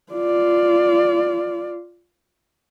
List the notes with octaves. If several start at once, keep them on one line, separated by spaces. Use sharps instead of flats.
F4 D5